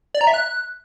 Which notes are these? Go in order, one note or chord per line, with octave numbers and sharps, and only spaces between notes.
D5
A#5
E5
F#6